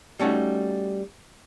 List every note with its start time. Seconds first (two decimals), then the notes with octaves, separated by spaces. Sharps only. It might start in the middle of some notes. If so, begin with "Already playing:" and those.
0.20 G3 A3 C#4 D#4 F#4